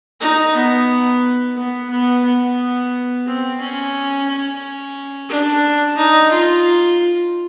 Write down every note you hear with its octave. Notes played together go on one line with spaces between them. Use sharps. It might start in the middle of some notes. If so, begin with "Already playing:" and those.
D#4
B3
B3
B3
B3
C4
C#4
C#4
D4
D#4
F4